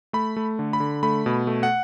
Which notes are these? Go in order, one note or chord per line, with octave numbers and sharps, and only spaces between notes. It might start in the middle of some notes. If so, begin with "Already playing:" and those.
A3 B5
A3
D3
B5
D3
A3 B5
B2
A3
F#5